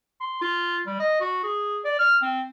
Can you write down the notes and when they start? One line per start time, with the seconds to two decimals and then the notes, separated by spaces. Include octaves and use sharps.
0.21 C6
0.42 F4
0.86 G3
0.99 D#5
1.20 F#4
1.44 G#4
1.85 D5
1.99 F6
2.22 C4